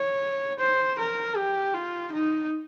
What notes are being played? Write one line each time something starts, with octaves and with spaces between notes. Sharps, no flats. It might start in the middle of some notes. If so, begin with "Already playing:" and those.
Already playing: C#5
C5
A#4
G4
F4
D#4